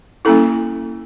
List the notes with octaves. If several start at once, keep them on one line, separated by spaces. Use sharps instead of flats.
G3 A#3 C#4 E4 A4